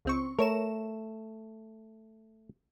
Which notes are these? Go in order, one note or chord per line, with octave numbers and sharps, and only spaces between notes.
C#2 C4 C#6
A3 A#4 C#5 E7